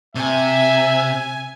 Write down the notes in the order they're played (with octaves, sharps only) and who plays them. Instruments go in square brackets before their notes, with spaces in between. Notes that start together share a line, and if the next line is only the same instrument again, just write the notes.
[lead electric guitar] C3 [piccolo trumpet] E5 [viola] G#5